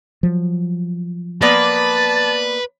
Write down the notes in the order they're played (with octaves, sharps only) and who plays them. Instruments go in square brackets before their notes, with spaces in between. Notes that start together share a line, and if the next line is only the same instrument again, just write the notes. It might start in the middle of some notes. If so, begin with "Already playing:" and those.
[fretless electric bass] F3 F#3
[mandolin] A#3 B3 D5 [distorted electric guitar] B4 [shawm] A5